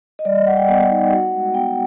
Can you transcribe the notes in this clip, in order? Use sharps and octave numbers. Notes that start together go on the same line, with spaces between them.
D#5
G3 D5
D#5
G3 F#5
G5
B3 F#5
D#4
F#4 F#5
G#3
B3 G5